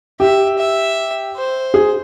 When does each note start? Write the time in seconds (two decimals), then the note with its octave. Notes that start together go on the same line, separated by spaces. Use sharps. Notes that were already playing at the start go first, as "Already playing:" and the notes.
0.20 G4 E5
0.58 E5
1.36 C5
1.74 G#4